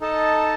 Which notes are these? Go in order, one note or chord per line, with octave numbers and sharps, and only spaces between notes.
D#4 A4 D#5 A5